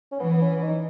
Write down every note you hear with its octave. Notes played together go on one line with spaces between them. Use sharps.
C#4
E3 B3
B3
C#4
D#4